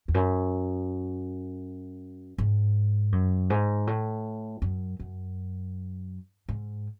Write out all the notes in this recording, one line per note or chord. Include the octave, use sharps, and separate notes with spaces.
E2
F#2
G#2
F#2
G#2
A2
F#2
F#2
G#2